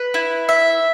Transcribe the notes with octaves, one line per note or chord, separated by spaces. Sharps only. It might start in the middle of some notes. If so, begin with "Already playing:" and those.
Already playing: B4
E4
E5